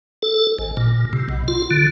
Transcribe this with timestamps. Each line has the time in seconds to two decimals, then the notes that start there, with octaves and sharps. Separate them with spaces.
0.22 A4
0.58 G#1
0.77 A#2
1.13 C3
1.29 B1
1.48 F4
1.71 D3